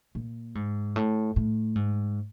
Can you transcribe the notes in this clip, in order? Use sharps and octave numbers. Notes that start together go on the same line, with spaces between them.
A#2
G#2
A2
A2
G#2